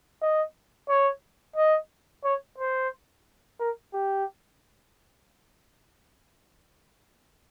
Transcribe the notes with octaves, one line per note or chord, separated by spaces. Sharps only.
D#5
C#5
D#5
C#5
C5
A#4
G4